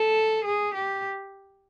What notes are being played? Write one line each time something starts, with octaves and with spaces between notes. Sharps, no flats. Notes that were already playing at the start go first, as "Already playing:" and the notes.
Already playing: A4
G#4
G4